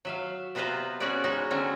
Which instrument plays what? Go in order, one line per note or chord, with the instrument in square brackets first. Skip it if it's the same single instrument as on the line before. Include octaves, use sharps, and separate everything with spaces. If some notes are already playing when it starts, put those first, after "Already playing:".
[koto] F#3 E5 F5
C3 B3 F4 B4 C5 A#5
B3 C#4 F#4 G#4 B4 D5
G#3 C#4 D#4 F#4
D3 F#3 C4 C#4